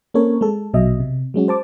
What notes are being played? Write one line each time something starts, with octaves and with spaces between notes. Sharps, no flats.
A#3 C4 C#4 A4 A#4 C#5
G#3 A4
A#1 B2 F#3 D#5 E5
C3
F#3 G#3 C#4 F#4
C5 A5 D6